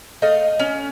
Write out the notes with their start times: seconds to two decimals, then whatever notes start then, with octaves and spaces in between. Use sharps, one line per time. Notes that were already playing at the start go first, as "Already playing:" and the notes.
0.22 A3 D#5 F5
0.59 C#4